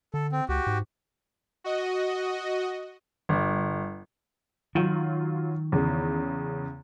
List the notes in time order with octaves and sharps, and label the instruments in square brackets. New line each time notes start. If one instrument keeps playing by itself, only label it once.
[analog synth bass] D3 [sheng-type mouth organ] A4
[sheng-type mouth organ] C4
[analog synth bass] C#2 [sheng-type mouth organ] F#4 G4
[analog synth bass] G#2
[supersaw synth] F#4 D#5
[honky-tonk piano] G1
[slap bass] D#3 [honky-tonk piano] F#3 F4
[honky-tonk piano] E2 C#3